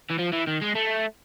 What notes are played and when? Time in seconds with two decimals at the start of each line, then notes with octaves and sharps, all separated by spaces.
0.10 E3
0.19 F3
0.33 E3
0.47 D#3
0.62 G#3
0.75 A3